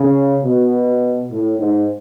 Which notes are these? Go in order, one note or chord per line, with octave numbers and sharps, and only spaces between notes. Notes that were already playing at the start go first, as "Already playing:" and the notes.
Already playing: C#3
B2
A2
G#2